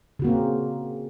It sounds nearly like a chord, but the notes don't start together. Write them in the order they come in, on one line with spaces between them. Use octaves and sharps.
C#3 F#4 A#3 C4